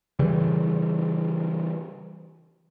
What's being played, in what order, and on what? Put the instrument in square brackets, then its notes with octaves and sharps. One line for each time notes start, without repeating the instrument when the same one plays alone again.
[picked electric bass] C#3 E3 G3